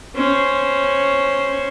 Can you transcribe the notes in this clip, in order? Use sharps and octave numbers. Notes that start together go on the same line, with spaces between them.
C#4 C5